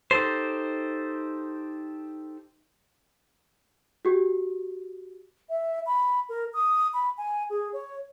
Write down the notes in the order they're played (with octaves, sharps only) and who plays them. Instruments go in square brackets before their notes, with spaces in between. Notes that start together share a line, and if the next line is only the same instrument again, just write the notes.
[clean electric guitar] D#4 G4 A4 C5
[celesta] F#4 G4
[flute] E5
B5
A#4
D#6
B5
G#5
G#4
C#5